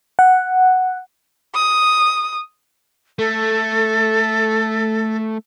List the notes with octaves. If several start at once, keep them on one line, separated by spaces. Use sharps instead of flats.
F#5
D#6
A3 A4